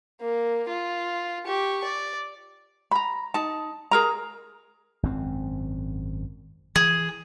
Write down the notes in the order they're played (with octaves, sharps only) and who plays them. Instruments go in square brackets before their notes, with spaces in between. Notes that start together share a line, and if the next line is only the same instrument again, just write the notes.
[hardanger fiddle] A#3
F4
G4 C#6
D5
[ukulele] A#5 B5
D#4 A5
G#4 A#4 A#5
[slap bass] G#1 F#2 C4
[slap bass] E3 [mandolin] G#4